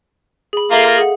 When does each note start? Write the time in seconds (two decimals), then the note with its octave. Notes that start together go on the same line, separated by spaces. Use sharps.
0.53 G#4 B5
0.71 A#3 F4 A4 A#4 E5 F5
0.98 G#4 F#5